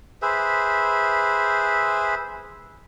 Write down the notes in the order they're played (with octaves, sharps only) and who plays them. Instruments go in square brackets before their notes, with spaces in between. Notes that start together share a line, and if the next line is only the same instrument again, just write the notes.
[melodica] G#4 B4 C5 E5